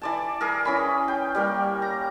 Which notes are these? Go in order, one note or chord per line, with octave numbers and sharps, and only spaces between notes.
E3 D5 A5
G#4 A#4
E3 C#4 B5
G5
G3 A#3 G5
A#5